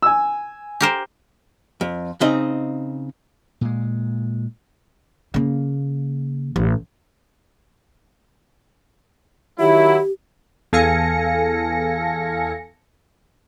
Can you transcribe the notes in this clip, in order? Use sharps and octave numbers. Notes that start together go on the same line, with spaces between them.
G#5 E6
G4 A#4 C5
F2
C#3 C4 D#4 D#5
A#2 G#3
C#3 A#3
A1
D#3 F#3 E4 G4
E2 A4 F5 G#5 A#6 C#7